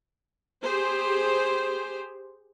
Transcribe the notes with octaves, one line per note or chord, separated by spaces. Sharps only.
G4 G#4 C5